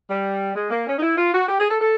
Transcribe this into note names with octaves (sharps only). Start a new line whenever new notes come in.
G3
G#3
A#3
C#4
D#4
E4
F4
F#4
G4
G#4
A4
A4